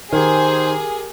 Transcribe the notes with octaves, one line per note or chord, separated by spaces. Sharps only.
D#3 G4 G#4 A#4 C5